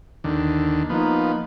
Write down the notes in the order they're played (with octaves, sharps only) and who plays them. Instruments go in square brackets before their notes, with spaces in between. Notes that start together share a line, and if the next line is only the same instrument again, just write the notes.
[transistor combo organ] D#2 D3
[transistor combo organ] F3 B3 [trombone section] A#3 D#4